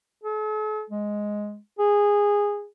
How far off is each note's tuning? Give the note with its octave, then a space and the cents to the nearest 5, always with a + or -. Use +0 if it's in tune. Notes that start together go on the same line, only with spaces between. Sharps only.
A4 -45
G#3 +5
G#4 -15